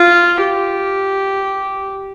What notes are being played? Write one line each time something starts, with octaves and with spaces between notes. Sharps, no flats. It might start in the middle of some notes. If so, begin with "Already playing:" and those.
Already playing: F4
G4